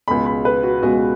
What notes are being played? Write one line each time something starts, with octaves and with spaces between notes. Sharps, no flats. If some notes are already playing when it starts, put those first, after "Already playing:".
C#2 B2 G#3 B5
B5
B4
F#4
C#2 B2 G#3 F#4